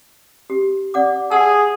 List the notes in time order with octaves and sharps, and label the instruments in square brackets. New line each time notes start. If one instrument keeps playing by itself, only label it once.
[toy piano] G4
D5 F#5 D6
[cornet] G#4 [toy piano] F#5 A5 E6